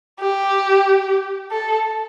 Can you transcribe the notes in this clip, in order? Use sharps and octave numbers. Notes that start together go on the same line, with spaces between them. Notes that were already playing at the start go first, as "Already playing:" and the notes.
G4
A4